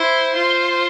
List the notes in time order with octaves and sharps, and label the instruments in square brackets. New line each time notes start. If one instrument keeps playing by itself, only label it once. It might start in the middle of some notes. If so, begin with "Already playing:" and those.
Already playing: [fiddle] E4 [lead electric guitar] C5
[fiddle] F4